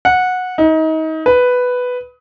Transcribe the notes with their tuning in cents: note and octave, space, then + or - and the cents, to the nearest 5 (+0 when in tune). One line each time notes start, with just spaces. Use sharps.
F#5 -15
D#4 +30
B4 +5